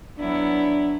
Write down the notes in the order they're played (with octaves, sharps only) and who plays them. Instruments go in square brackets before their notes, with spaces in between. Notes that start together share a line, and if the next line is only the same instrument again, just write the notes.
[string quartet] F#3 B3 E4 [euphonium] D4